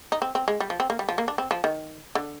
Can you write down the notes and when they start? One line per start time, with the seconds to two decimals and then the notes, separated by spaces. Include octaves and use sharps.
0.12 D#4
0.22 C4
0.35 C4
0.48 G#3
0.60 G3
0.70 F3
0.80 C4
0.90 A#3
0.99 G3
1.09 F3
1.18 A#3
1.28 D4
1.38 C4
1.51 F3
1.64 D#3
2.15 D3